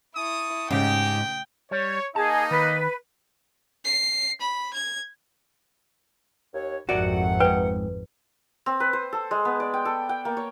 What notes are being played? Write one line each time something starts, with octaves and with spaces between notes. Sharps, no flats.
E4 A5 C#6 D#6
G#2 C#3 D#4 G4 G5
G3 C#5
A#3 D#4 G#4 D#5 A5
D#3 B4
C7
B5
G#6
D#2 C#5
G#1 F2 C3 D#3 F#4 D5 F#5
G#2 B4 G5
C4
B4
C5
A4
G#3
B3
D5
G5
A4
G5
A#3
C#5